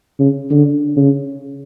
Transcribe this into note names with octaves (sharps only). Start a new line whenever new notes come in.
C#3
D3
C#3